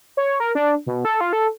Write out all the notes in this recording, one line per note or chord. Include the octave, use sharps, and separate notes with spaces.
C#5
A#4
D4
B2
A4
F4
A4